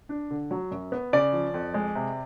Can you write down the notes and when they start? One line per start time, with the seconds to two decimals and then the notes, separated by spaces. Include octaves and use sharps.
0.09 D4
0.31 D3
0.51 F#3
0.71 F#2
0.92 B3
1.13 C#3 D5
1.33 F3
1.54 F2
1.74 G#3
1.95 C3